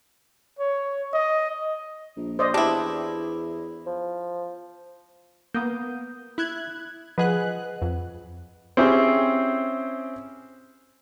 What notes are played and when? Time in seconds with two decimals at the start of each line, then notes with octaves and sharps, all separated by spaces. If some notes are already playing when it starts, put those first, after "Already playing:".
0.59 C#5
1.13 D#5
2.16 A#1
2.39 C5 D5 D#5
2.54 E2 D4 E4 G4
3.86 F3
5.54 A#3 B3 D#6 G6
6.38 E4 F#6 G#6
7.18 F3 G#4 B4 D#5 F#5 F#6
7.82 F2
8.77 C4 C#4 E4 G4 G#4 C5